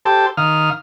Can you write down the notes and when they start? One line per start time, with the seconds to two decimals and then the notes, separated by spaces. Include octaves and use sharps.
0.05 G4 A4 C5 A5
0.37 D#3 F5 D#6 F6